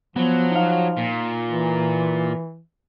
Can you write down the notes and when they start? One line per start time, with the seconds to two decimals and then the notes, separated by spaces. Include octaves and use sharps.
0.16 F3 F#3 B3
0.51 D#4 F5
0.97 A#2
1.49 E3